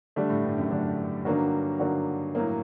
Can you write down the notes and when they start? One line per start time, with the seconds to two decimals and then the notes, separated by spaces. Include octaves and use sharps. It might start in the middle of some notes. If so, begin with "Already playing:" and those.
0.16 D3 G3 A3 D4
0.30 A2
0.44 G2
0.58 F#2
0.70 F#2 D3 A3 D4
1.25 G2 D3 F#3 A#3 D#4 F#4
1.80 D3 F#3 A#3 D#4 F#4
2.35 A2 F#3 A#3